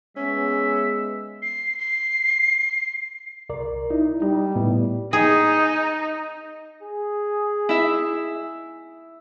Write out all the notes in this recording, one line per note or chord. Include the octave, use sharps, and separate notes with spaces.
G#3 B3 C#4 E5
C7
C7
C2 A#4 D5
D#4 E4
G3 D#4
A2 B3 E4
D#4 G#4
G#4
E4 E5